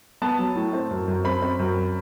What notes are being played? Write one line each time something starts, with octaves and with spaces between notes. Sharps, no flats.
B3 A5
F#3
A2
C4
F#2
F#2
C4 B5
C4
F#2